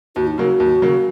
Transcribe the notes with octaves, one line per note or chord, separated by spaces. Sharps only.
D#2 F#4
D#4
C#3 F#3 A#3 F#4
D#2
C#3 F#3 A#3